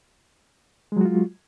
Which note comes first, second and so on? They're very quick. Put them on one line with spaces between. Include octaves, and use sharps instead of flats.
G#3 F#3 F#4 F4